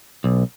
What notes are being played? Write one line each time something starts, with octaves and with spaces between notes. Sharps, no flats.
B1